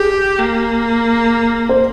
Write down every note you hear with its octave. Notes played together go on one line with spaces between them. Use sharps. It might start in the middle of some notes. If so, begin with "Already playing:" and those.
Already playing: G4 G#4
A#3
C5